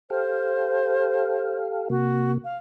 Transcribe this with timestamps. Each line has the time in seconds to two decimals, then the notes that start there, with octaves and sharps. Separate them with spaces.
0.10 G4 A4 C5 F5
1.90 C3 A#3 F#4
2.44 F5